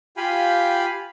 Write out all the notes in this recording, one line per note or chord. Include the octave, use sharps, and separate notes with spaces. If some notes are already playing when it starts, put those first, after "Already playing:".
F4 G4 F5 G5 G#5 B5